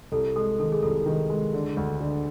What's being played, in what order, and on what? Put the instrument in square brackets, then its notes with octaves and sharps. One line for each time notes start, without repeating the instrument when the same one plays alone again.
[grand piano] C2 [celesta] A4
[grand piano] G#3 [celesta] A4
[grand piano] D#3 [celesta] A4
[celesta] G#4
[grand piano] C2 [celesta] A4
[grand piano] D#3
G#3
D3
D2
D3